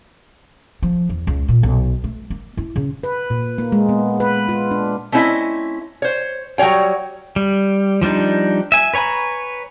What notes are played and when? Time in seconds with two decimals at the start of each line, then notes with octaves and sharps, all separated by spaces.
0.82 F3
1.09 E2
1.27 C#2
1.48 A#2
1.63 B1
2.04 A3
2.30 A#3
2.57 E4
2.76 C#3
3.03 B4
3.30 A#2
3.58 A#3
3.72 G#3
3.89 B3
4.20 B4
4.49 F4
4.71 D4
5.12 A3 C4 C#4 E4 D#5
6.02 C5 C#5
6.58 F#3 G3 C5 C#5 G5
7.36 G3
8.01 F3 G3 D4 D#4
8.72 E5 G#5
8.94 B4 C#5 G#5 A#5 B5